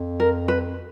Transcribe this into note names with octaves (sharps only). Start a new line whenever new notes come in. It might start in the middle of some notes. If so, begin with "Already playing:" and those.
Already playing: F2
A#4
B4